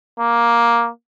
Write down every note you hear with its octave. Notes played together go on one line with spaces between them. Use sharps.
A#3